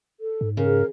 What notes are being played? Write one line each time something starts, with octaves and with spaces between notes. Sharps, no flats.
A4
G#2
C#3 A#4